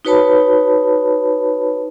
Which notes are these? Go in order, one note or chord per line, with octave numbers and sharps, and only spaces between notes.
D#4 F#4 B4 C#5 A5 B5